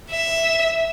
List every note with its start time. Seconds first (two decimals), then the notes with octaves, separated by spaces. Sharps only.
0.10 E5